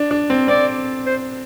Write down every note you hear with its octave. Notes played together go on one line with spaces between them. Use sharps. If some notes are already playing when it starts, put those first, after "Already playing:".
Already playing: D4
D4
C4
C4 D5
C5